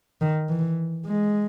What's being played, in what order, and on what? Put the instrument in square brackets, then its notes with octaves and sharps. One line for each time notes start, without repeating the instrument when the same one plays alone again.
[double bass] D#3
E3
G#3